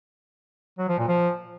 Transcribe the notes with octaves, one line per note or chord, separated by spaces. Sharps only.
F#3
F3
A#2
F3